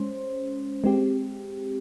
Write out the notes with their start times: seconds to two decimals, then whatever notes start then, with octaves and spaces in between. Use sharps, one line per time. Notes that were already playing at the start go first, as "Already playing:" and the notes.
Already playing: G#3 C#4 C5
0.84 G#3 C4 G4